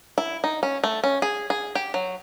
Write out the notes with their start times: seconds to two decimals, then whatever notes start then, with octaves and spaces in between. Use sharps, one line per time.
0.18 E4
0.44 D#4
0.63 C#4
0.84 A3
1.04 C#4
1.22 G#4
1.50 G#4
1.75 G4
1.94 F#3